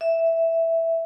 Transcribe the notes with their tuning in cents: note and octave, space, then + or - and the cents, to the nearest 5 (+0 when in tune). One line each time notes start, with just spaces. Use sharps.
E5 +0